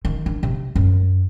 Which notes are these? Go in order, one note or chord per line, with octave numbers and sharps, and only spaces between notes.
D#3
D4
C3
F#2